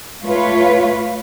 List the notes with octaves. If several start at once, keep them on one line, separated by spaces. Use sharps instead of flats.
A3 F4 B4 C#5